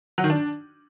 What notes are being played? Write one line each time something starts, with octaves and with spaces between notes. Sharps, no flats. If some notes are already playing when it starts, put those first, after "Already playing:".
F#3
D#3
D4